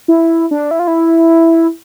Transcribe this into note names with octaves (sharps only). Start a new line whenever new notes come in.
E4
D4
E4
F4
E4